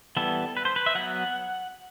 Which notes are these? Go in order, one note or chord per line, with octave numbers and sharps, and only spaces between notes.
E3 G3 B3 A4
B4
C5
B4
E5
F#3 B3 F#5